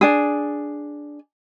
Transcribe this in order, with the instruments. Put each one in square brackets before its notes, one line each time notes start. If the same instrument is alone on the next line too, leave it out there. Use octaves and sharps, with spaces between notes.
[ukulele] D4 G#4